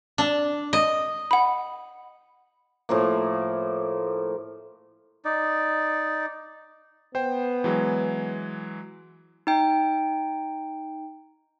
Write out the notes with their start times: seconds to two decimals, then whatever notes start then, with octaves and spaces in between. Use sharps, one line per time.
0.18 D4
0.73 D#5
1.31 F#5 B5
2.89 A2 F3 A#3
5.25 D#4 D5
7.15 B3 C5 G5
7.64 E3 F#3 G#3
9.47 D#4 G5